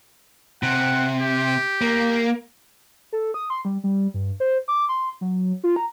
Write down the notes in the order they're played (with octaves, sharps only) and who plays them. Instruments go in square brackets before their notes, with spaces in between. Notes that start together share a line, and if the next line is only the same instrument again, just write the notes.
[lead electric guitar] C3 [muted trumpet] F#5
[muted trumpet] G4
[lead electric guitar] A#3
[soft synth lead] A4
D#6
C6
G3
G3
G2
C5
D6
C6
F#3
F4
A#5